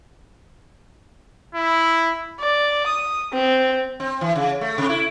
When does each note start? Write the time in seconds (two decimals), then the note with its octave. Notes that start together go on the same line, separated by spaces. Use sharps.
1.55 E4
2.40 D5
2.87 D#6
3.33 C4
4.00 C4
4.21 E3
4.36 C#3
4.61 A3
4.78 C3
4.89 E4